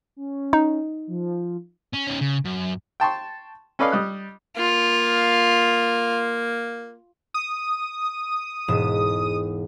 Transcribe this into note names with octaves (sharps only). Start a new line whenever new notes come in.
C#4
D#4
F3
C#4
C#4 D#4
C#3
F#2
G5 A5 C6 C#6
C#4 A4 B4 D5 D#5 F5
G3 D#5 D#6 F#6
A#3 F4
D#6
E1 G#2 E7